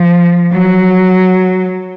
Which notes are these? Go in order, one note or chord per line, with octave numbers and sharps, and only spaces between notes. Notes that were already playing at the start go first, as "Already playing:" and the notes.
Already playing: F3
F#3